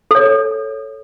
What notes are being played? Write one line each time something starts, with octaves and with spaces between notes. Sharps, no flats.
A4 C#5